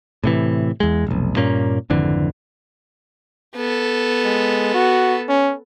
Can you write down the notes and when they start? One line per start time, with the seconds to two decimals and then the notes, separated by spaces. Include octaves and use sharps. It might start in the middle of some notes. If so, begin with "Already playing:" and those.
0.24 A2 C3 E3
0.80 E2 G#3
1.07 F1 B1
1.36 G2 A#2 A#3 C#4
1.90 G#1 F2 D3 E3
3.56 B3 A4
4.25 G#3
4.74 F#4
5.29 C#4